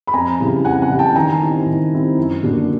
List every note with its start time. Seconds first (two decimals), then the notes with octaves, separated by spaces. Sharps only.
0.07 B5
0.13 F2 G#5 A#5
0.39 C#3 E3 G3
0.65 F2 F#5 G#5
0.82 F#5 G#5
0.90 C#3 E3 G3
0.99 G5 A5
1.15 D#3 G#5 A#5
1.41 G3 C4 E4
1.66 D#3
1.92 G3 C4 E4
2.17 F#2
2.43 D3 F#3 A#3 D4